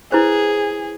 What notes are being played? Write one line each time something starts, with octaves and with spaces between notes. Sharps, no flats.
E4 G#4 B4 C5